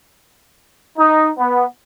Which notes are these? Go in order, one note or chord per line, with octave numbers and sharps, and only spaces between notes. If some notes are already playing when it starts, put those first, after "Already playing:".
D#4
B3